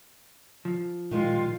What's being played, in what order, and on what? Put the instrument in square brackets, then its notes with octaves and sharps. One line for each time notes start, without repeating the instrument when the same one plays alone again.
[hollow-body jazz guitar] F3
[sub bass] A#2 [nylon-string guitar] D#3 G3 G#3 [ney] F4